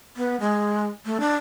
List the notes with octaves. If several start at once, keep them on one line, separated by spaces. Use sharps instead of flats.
B3
G#3
A3
D4